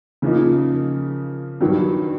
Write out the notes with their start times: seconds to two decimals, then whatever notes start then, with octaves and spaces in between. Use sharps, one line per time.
0.22 C#3 F3 A#3 D#4
1.61 G2 D#3 F#3